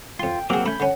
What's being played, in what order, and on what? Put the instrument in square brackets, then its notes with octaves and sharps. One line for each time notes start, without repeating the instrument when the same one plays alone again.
[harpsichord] F2 C6 [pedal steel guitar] F4 [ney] G5
[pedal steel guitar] F#3 A#3 C4 [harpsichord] G4 G#4 [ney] F#5
[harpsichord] A3 [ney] C#4 [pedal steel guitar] B5 G6
[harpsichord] D3 C#4 [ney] F#5